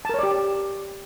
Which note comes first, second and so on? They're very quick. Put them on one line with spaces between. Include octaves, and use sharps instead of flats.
A5 A#4 C#5 D5 G4